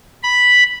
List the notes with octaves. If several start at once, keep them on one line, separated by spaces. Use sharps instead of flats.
B5